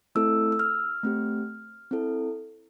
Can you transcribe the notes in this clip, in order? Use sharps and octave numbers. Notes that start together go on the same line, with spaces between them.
A3 C4 E4 A4 E6
E6
F6
A3 C4 G4
C4 E4 A4